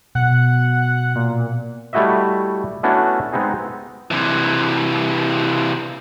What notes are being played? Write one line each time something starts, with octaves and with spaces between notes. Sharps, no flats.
B2 F#5
A#2
G3 A3 E4 F#4 D#5 E5
A3 B3 C#4 D4 E4 F#4
G#3 B3 C4 D#4 G#4
C3 E3